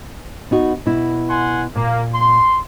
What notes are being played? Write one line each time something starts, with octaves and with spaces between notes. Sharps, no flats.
B3 D#4 F#4
B2 E4
F#5 G#5 C6
A#2 A#3
C6